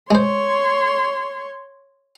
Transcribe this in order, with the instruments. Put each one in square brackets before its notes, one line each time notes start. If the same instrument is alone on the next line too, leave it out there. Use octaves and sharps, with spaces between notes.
[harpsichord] G#3 C5 [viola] C#5 C6